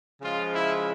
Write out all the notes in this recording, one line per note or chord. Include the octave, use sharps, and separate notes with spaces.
C#3 F3 G#3 F4
E4